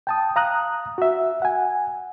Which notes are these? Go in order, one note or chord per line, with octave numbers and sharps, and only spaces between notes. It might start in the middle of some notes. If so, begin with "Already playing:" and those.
G5 A5 D#6
F5 A#5 D#6 F#6
F#4 E5
F#5 G#5